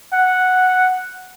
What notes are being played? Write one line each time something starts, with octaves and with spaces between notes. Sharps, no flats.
F#5